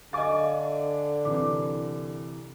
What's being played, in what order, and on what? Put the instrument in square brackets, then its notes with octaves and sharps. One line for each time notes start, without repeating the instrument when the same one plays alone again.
[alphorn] D3 [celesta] D#5 F5 [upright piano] G#5 D6 A6
[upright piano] C2 E3 [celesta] D6